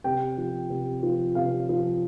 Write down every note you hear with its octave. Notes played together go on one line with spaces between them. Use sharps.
C3 G5
F3
C3
F3
C3 F5
F3